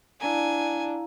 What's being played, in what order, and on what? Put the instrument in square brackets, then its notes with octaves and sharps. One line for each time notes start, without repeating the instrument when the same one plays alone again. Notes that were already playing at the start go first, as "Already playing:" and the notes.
[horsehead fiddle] D4 [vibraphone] E4 F5 A#5 [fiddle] G#5